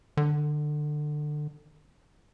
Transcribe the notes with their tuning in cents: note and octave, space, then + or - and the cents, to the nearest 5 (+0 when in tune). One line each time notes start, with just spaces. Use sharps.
D3 +25